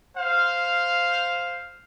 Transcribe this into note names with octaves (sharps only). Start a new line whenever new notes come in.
C5 F5